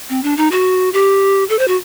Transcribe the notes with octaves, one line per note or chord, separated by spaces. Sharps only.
C4
D4
D#4
F#4
G4
A4
C5
F#4